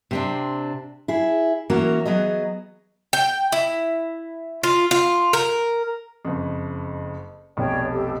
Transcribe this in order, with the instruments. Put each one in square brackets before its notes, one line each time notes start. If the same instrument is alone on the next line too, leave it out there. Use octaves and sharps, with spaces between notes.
[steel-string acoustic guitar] C3 C4 D4
E4 G#4
E3 A#3 C#4 F#4 A#4
F#3 B3 G#4 D#5
[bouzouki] G5
E4
F4
F4
A#4
[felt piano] F#1 F2
[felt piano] F1 B1 [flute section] C#5 D5 G5
[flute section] G4 A4